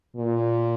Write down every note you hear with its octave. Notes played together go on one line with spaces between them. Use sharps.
A#2